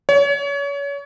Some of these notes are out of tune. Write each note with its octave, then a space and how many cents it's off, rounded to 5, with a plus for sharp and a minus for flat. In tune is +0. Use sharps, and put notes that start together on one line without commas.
C#5 +30